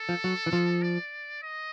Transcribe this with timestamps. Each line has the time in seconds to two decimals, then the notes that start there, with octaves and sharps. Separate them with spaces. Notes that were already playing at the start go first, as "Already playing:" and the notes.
Already playing: A4
0.09 F3
0.24 F#3
0.46 E3
0.53 F3
0.82 D5
1.42 D#5